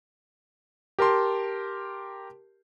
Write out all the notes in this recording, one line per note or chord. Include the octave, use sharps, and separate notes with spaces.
G4 A#4 A5 C6